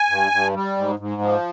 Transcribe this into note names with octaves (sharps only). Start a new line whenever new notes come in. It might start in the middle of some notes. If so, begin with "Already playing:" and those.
Already playing: G#5
G2
G2
G3
G#2
G#2
F3